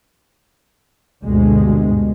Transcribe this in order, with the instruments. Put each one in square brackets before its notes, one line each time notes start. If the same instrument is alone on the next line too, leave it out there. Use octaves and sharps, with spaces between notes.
[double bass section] D2 G2 B2 G#3